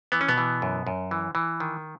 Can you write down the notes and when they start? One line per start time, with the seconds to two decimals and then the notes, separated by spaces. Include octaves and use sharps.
0.12 E3 B3
0.21 C#4
0.28 B2 B3
0.38 E3
0.62 F#2
0.87 F#2
1.11 E3
1.35 E3
1.60 D#3